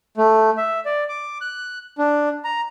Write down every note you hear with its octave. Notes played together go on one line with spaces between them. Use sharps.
A3
E5
D5
D6
F#6
D4
A#5